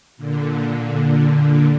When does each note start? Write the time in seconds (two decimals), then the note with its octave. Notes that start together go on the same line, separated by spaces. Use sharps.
0.17 A#2 D3